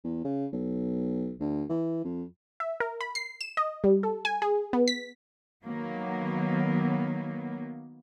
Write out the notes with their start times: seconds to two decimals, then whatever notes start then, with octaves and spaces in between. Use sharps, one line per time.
0.04 E2
0.24 C#3
0.52 B1
1.40 D2
1.69 E3
2.04 F2
2.60 E5
2.80 A#4
3.01 B5
3.15 C7
3.41 E7
3.57 D#5
3.84 G3
4.03 A4
4.25 G#5
4.42 G#4
4.73 B3
4.88 B6
5.65 D#3 F#3 A#3 B3